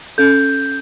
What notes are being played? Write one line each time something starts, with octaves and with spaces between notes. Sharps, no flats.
C#4 A4 G6